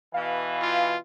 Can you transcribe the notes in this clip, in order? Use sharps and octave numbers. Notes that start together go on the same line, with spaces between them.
B2 E3 F5
F4